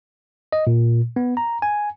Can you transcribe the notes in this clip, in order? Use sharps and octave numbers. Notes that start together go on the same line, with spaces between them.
D#5
A#2
B3
A#5
G#5